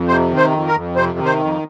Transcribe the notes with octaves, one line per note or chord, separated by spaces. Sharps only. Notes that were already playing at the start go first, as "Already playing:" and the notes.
Already playing: F2
C3 C5
D#3
C5
F2
A#4
F2
C3 C5
D#3
C5
F2